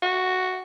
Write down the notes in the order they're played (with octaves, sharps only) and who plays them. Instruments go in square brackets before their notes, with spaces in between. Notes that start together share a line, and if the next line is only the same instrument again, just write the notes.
[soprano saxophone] F#4